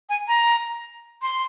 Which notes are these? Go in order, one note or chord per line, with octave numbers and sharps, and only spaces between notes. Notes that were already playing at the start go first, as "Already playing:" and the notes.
G#5
A#5
C6